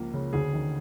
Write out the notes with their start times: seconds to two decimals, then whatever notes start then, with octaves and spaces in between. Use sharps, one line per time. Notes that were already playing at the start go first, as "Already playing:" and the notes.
Already playing: C#2 C#3 F3 A#3
0.14 C#3
0.33 D2 G#4
0.53 D#3